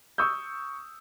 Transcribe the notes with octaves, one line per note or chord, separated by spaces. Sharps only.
C#6 D#6 E6 G6